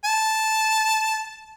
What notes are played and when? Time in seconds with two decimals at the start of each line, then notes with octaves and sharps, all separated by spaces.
0.05 A5